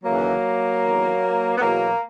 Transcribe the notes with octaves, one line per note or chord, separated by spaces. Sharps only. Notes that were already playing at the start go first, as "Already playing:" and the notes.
D#2 C#3 E3 F#3 A#3
E2 D#3
B3
E2 B2 F#3 A#3